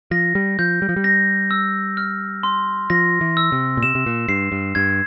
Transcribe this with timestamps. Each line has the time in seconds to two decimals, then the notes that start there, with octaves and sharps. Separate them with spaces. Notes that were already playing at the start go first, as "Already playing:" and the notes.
0.11 F3 A#6
0.35 G3
0.59 F3 G6
0.82 G3
0.89 F3
0.96 G3
1.04 A#6
1.51 E6
1.97 F6
2.43 C6
2.90 F3 A#6
3.21 E3
3.37 E6
3.52 C3
3.77 A#2
3.83 C3 E7
3.95 C3
4.06 A#2
4.28 G2 C7
4.52 G2
4.75 G2 G#6